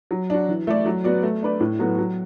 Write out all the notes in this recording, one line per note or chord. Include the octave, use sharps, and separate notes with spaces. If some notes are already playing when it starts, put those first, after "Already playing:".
F#3
D4 F#4
E3
A3 E4 A4 D5
F#3
B3 F#4 D5
A3
D4 B4 D5
A2
F#3 B3 F#4 A4
F#3